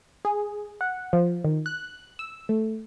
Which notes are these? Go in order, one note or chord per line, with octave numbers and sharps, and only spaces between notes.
G#4
F#5
F3
D#3
F#6
E6
A3